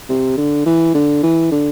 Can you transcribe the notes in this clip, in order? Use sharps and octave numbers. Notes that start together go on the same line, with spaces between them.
C3
D3
E3
D3
E3
D3